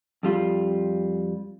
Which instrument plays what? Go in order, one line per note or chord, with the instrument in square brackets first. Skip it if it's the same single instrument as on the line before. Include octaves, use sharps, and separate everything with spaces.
[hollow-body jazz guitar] F2 G3 F4